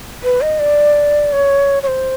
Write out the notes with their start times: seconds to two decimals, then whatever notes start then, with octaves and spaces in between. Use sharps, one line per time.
0.24 B4
0.41 D#5
0.59 D5
1.33 C#5
1.83 C#5
1.87 C5